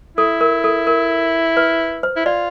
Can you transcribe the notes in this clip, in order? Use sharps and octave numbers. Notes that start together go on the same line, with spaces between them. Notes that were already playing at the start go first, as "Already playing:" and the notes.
E4 A4
A#4
A4
A#4
B4
C5
E4
F4 D5